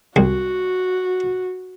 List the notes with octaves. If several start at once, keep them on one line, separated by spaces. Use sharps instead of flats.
C2 F#4